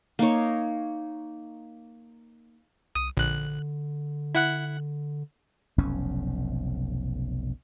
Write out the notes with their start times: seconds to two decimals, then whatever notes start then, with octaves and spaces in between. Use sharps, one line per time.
0.19 A#3 D#4 C#5
2.95 C2 D#6
3.17 A#1 D3 F#6
4.35 E4 F#5 F#6
5.78 F1 B1 F2 C#4